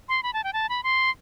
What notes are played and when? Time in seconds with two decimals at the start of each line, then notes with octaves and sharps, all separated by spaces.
0.09 C6
0.23 B5
0.33 A5
0.44 G5
0.53 A5
0.69 B5
0.83 C6